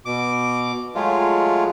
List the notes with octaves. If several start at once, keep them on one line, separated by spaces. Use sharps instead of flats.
B2 D6
F#3 G#3 A3 F4